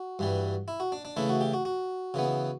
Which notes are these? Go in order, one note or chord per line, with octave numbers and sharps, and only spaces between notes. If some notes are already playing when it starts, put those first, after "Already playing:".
Already playing: F#4
G2 E3 G3
E4
F#4
D4
D4
C#3 E3 A3 E4
F#4
G4
F#4
F#4
C#3 E3 B3